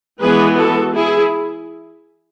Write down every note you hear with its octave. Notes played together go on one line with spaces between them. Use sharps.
E3 G#3 B3 G#4 B4
F#4 A4
E4 G#4